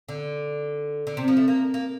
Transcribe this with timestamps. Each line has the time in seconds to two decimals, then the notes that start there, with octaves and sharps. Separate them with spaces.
0.09 D3
1.07 D3
1.17 C3
1.28 F3
1.37 A3
1.48 A#3
1.74 A#3